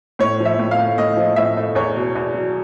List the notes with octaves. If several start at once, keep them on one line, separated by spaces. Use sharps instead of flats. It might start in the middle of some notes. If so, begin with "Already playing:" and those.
A2 C#5
F3
E5
A2
F5
A3
A2 D#5
F3
A2 E5
A3
E2 C#5
B2
E2
F#3